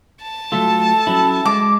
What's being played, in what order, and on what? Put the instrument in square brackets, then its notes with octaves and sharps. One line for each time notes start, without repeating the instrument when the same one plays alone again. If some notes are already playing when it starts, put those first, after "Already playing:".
[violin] A5
[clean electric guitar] F#3 A3 F4 [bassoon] A4
[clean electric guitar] F#3 C#4 E4
[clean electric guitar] G#3 [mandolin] D6